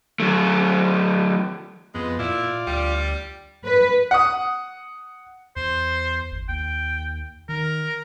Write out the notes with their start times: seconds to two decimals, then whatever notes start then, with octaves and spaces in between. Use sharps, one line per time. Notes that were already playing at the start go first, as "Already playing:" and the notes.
0.20 F#3 A3
1.95 F2 G#3 B3
2.19 A#2 E4 F4 D5
2.67 D2 G3
3.64 B4
4.11 F#5 D#6
5.56 E2 C5
6.32 G1
6.48 D#2 G5
7.49 D#3 A#4